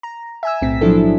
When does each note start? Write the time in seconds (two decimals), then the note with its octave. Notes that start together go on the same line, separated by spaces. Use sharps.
0.03 A#5
0.43 E5 G#5 E6
0.62 B1 A2 C4 B6
0.81 F3 F#3 D4 E4 A4